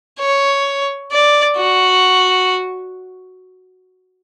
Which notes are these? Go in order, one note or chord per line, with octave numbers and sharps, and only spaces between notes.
C#5
D5
F#4